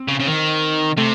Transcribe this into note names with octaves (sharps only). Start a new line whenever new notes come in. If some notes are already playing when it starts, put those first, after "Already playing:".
Already playing: C4
C#3
C#3
D#3
C3 A3